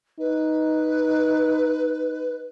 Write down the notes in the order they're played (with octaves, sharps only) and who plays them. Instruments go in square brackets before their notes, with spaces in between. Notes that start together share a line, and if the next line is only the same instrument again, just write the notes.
[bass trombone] D#4 [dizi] B4